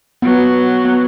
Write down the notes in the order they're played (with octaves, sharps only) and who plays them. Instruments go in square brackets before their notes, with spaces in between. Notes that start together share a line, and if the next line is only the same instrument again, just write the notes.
[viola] F#3 [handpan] B3
[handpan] B3